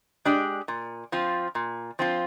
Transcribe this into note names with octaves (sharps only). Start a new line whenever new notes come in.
G#3 D4 G4 D5
A#2
F3 C4 F4
A#2
F3 C4 F4